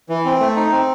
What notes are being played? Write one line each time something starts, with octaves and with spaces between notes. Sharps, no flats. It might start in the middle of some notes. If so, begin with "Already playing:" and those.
E3
C4
A3
D#4
C4